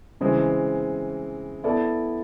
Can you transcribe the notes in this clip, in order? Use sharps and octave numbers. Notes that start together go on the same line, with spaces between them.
C#3 E3 G#3 C4
B3 E4 A4 D5